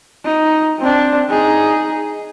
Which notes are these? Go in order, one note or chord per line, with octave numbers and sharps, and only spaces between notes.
D#4
C4 D4
D#4 G#4